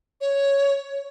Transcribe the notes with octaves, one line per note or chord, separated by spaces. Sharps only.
C#5